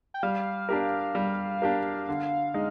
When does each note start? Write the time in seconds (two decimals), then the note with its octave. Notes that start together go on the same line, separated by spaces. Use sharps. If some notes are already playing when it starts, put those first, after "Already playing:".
0.14 G5
0.23 G3 F5
0.69 D4 G4 A#4
1.15 G3
1.62 D4 G4 A#4
2.09 D3
2.54 G#3 D#4